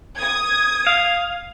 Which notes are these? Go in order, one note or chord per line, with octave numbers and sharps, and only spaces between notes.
D#6 G#6
F5